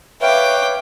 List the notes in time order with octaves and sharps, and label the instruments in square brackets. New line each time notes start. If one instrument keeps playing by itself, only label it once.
[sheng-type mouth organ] B4 C#5 F5 [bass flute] E5 [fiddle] G5 D6